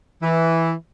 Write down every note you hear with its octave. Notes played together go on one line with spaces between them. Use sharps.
E3